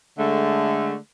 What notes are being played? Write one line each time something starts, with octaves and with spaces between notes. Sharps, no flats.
D3 G#3 A3